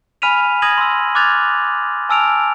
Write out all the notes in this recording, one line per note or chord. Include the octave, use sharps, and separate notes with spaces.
G#5 B5 F6 B6 D#7 F7
D#6 G#6 A#6 D#7 F#7
C6 E6
D6 F6 F#6 G#6 A6 F7
G#5 A5 E6 F6 D7 F7